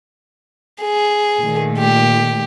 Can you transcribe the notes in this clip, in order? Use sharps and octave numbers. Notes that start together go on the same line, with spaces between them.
G#4
A#2 D#3 A3
G4